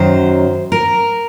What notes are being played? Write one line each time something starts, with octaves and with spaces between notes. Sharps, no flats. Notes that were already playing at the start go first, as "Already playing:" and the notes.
Already playing: F#2 D#3 F#3 C5
A#4